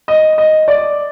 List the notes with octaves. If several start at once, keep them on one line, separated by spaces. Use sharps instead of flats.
D#5
D#5
D5